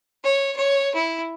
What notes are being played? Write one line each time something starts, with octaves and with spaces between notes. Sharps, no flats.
C#5
C#5
E4